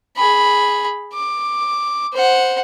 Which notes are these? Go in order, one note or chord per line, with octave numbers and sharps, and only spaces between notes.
G#4 B5
D6
C5 F#5